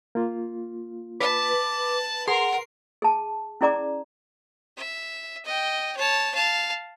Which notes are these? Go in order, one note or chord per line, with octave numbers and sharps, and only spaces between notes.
A#3 F4
B4 A5 D6
G#4 A#4 F#5 C6
G#4 A5
C#4 E4 G#4 D5 A#5 D6
E5
D#5 G5
C#5 A5
F5 A5